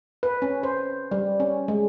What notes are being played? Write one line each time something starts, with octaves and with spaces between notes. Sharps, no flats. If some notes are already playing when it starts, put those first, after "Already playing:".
B4
C#4
C5
G3
C#4
G#3